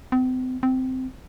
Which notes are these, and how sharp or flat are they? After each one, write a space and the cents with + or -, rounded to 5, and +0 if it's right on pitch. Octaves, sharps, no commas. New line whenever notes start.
C4 -40
C4 -15